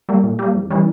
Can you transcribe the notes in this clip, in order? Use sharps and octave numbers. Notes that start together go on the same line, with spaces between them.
G3 A#3
A#2
G3 A#3
F2
E3 G3 C#4